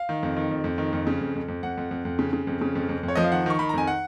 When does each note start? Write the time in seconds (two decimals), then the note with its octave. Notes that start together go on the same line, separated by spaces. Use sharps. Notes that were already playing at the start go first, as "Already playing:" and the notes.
Already playing: F5
0.09 D#3
0.23 F2
0.37 D#3
0.51 F2
0.64 F2
0.78 D#3
0.93 F2
1.07 C#3
1.21 F2
1.35 F2
1.48 F2
1.63 F2 F#5
1.77 F2
1.91 F2
2.05 F2
2.19 C#3
2.33 C#3
2.47 F2
2.61 C#3
2.75 F2
2.89 F2
3.03 F2
3.08 C#5
3.15 F3 D#5
3.24 F5
3.32 D#3 F#5
3.46 D#3 C#6
3.59 D#3 B5
3.69 A#5
3.74 F2 G#5
3.87 F#5